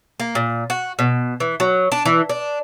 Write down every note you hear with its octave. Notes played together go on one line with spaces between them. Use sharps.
A#3
A#2
F#4
B2
E3
F#3
D4
E3
D4